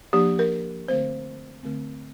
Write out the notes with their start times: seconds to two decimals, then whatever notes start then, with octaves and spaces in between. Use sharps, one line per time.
0.13 F3 A#3 D4 G4
0.39 A#4
0.88 D3 A3 C4 C5
1.63 D3 A3 C4